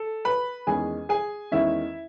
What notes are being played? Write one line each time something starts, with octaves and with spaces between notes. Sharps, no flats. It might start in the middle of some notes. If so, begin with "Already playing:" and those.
Already playing: A4
B4 B5
E2 D#3 G#3 C#4 G#4 G#5
G#4 G#5
E2 D#3 G#3 C#4 E4 E5